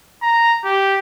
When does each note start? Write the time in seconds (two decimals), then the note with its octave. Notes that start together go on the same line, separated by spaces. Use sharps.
0.22 A#5
0.64 G4